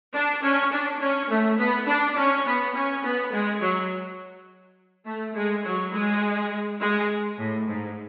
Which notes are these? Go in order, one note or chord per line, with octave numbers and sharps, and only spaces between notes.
D4
C#4
D4
C#4
A3
B3
D4
C#4
B3
C#4
B3
G#3
F#3
A3
G#3
F#3
G#3
G#3
A2
G#2